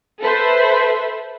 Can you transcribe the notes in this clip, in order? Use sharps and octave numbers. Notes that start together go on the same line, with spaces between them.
A4 B4 C5 E5